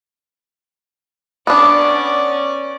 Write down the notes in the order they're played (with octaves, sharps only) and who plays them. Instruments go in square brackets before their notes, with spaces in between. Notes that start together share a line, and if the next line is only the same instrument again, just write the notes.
[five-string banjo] B3 D4 [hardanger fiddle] C#4 D5